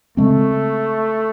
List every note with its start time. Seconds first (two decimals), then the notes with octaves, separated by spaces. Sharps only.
0.17 C#3 G#3 A3 C4